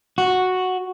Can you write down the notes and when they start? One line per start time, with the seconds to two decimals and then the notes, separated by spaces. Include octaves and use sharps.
0.18 F#4